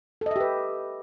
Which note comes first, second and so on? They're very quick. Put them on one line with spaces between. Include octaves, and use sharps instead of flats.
A4 D#5 E5 G4 B4